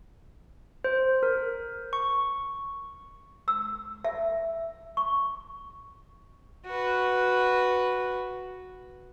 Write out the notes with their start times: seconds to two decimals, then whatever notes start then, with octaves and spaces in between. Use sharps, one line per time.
0.84 C5
1.23 A#4
1.93 C#6
3.48 E6
4.05 E5
4.97 C#6
6.66 F#4 B4